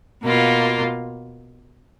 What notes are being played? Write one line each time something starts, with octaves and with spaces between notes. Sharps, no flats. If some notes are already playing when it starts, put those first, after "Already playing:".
B2 A#3 F4